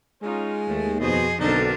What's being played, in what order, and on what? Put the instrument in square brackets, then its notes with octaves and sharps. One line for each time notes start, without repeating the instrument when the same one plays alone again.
[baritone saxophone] G#3 [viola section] C#4 D#4 F4
[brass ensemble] D#2 [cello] A3
[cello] F2 G#4 [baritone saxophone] B2 [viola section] F#4 C5 D#5
[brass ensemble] B1 [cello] D3 D4 [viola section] C4 A4 A#4 [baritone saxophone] D#4